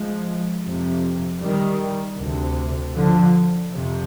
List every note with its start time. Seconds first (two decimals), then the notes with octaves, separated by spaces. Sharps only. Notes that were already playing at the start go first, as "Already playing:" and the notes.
Already playing: F3 G#3
0.63 F2 C3
1.40 D#3 G3
2.17 D2 C3
2.95 D3 F3
3.71 F2 C3